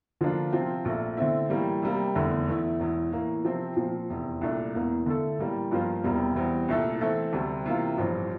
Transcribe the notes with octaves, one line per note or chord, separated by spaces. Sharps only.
D3 F3 A#3 D4 F4
C3 F3 C4 F4
A#1 A#2 A3
D3 A3 C4 E4
A2 E3 G3 A#3
C3 G3 A#3
F1 E2 D3 A3
E2 E3 A3 E4
E1 E2 E3
A2 E3 A#3
C3 F3 C4
A#2 F3 C4
F1 E2 C3
C2 A#2 A3 D4
E1 E2 E3 A#3
D3 A3 E4 A4
A1 A2 G3 A#3
G2 F3 A#3 F4 C5
E1 E2 C3 G3 A#3
E2 E3 G3 C4
C2 A#2 A3 E4 A4
E3 A3 C4 E4 A4
D2 C3 G3
C3 E3 A#3 F4
A1 G2 F3 C4 G4